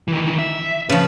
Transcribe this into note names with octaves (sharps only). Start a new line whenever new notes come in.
D#3 E3
E5
C#3 F3 B4